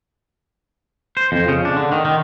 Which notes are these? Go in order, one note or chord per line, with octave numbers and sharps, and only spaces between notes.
C5
F2
C#3
D4
D3
D#3
D#3